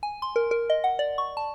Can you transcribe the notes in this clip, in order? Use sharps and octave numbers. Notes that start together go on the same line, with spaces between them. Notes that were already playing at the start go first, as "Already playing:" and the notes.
G#5
C6
A#4
A#4
D#5
F#5
D5
C#6
A5